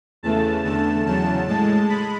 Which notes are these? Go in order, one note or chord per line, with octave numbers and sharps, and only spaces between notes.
E2 C#3 E3 A3 A5
E2 D3 A3 A5
E2 C#3 F#3 A5
A2 G#3 A5
G#3 B5